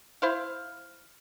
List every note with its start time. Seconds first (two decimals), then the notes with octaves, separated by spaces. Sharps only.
0.22 E4 C5 F5